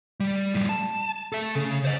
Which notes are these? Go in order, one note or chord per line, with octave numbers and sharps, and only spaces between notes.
G3
A2 G3
A5
A4 E5
C#3
C5 D#5